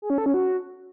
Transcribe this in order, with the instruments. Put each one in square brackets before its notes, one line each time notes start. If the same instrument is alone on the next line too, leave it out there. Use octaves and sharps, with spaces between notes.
[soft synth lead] G#4
C#4
A4
C#4
F#4